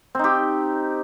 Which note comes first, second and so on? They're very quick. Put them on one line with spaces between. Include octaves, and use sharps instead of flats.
C4 D#4 G4